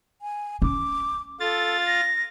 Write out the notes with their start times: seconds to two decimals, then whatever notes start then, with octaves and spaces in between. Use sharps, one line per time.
0.22 G#5
0.62 C#4 D6
1.40 F4 A4 A6
1.86 A#6